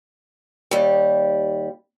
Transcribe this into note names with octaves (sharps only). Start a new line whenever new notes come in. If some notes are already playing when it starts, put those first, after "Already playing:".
D#2 G3